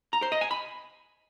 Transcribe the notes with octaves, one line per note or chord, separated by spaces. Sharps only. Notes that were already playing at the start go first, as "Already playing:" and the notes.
A#5
C5
D#5
G#5
B5